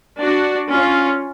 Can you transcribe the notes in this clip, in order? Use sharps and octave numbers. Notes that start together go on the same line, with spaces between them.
D4 F#4
C#4 F4